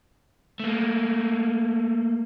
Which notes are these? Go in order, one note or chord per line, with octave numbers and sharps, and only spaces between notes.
A3 A#3